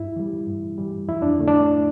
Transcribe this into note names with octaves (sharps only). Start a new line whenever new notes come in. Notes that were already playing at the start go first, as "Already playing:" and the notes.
Already playing: G2 E4
E3 G3
G2
E3 G3
F2 E4
D4
D3 A3
D4